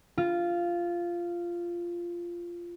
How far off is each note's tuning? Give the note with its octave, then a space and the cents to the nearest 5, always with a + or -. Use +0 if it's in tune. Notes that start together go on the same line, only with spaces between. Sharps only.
F4 -10